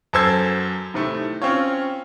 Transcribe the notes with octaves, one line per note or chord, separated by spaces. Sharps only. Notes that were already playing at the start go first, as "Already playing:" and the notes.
F#2 A4 C5 E6 G#6
A2 C3 D#3 A3
C4 C#4 F4 C#5